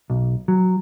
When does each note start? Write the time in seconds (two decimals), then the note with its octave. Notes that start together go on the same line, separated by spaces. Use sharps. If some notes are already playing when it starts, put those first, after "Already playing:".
0.10 B1
0.48 F#3